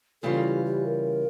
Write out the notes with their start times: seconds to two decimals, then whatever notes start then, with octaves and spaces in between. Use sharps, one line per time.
0.22 C#3 E3 G3 C#4 F4 A4
0.43 G4
0.65 G4
0.85 A#4